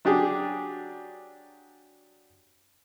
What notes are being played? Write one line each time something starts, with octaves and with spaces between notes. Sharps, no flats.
F#3 D4 G4 G#4